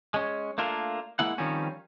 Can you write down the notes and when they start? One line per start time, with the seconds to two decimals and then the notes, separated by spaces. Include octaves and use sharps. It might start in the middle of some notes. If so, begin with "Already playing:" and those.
0.14 G#3 C#4
0.58 A3 A#3 D4 F4 A#4
1.19 G#3 A#3 E4 F#5
1.38 D#3 F3 G3 C4 C#4